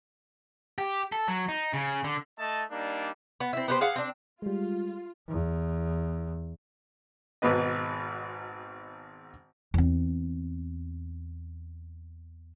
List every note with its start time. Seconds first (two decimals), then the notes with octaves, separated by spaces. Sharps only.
0.78 G4
1.12 A4
1.28 F#3
1.49 D#4
1.73 C#3
2.04 D3
2.39 A3 D#5 A5
2.71 G3 A#3 D4 D#4
3.40 B3
3.53 C4 E4
3.68 B3 G4 C5
3.81 G#4 F5 F#5
3.96 C4 D4
4.42 G3 G#3 F4
5.28 E2
7.42 G#1 G#2 B2 B4 D#5
9.74 E2 C4